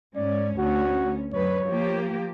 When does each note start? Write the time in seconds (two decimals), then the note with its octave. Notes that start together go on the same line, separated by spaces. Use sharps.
0.16 G#2 C#4 D5
0.58 D2 C#4 F#4
1.33 F#2 B4 C#5
1.66 F3 A#3 G4